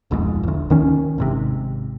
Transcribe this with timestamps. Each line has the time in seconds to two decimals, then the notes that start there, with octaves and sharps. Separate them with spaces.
0.11 D1 B1 F2 G#2
0.43 E1 D2
0.70 D#2 D#3 C#4
1.18 G#1 G#2 C3